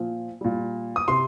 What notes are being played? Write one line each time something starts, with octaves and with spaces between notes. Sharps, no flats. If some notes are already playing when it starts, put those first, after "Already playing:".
Already playing: A#2 F3
A#2 G3
D#6
C3 C6